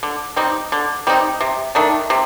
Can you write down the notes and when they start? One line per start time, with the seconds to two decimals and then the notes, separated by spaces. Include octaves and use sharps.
0.03 D3
0.36 G3 C4 D#4
0.72 D3
1.07 G3 C4 D#4
1.41 C3
1.75 D#3 A3 D4
2.10 C3